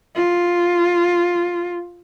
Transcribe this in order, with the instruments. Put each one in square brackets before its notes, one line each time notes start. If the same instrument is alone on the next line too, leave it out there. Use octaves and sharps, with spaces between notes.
[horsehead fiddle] F4